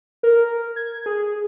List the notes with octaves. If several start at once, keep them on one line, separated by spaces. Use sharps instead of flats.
A#4
G#6
G#4